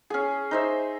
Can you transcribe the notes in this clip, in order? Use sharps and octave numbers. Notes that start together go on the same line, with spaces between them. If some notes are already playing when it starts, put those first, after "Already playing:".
C#4 G#4
D#4 C5 E5